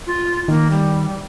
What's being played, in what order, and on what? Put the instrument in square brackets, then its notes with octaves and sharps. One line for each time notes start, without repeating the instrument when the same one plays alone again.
[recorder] F4
[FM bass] D#3 [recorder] A#3
[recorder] G3